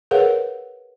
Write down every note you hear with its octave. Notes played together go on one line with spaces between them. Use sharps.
G#4 A#4 B4 C#5 F5 F#5